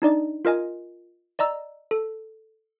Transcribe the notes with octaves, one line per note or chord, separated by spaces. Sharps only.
D4 D#4 D5 D#5
F4 A#4 D#5 G#5
D5 D#5 A#5 E6
A4